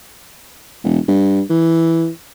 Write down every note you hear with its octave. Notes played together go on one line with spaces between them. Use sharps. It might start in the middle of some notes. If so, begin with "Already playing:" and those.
E1
G2
E3